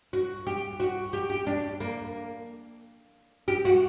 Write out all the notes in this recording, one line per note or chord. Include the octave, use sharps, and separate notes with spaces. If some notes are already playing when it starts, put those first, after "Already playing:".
F#4
G4
F#4
G4
G4
D4
A#3
G4
F#4